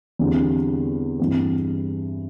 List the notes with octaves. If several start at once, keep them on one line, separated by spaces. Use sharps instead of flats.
E2 D3 G3 C4
G2 E3 C4